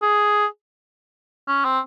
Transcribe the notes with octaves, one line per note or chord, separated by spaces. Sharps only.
G#4
C#4
C4